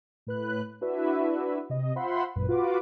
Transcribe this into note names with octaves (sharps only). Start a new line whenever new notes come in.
A2 B4 F#6
D4 E4 F#4 B4 E5
C3 D#5
F4 C5 E5 F#5 B5 C6
G#1 F#2 A#2 B4
F4 F#4 B4 D6